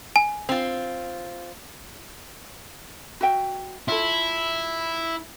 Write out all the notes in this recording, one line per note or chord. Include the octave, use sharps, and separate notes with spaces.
G#5
C4 F4
F#4 E5 G5
E4 F4 A4